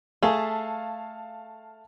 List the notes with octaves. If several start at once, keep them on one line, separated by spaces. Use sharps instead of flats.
A3 G#4 F5 A5